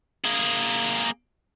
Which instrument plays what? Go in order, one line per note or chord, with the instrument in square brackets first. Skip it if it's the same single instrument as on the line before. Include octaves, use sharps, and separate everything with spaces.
[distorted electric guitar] A#3 G#4